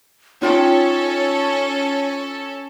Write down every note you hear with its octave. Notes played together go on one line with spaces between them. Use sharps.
C#4 D#4 F4 A4 C#5 G5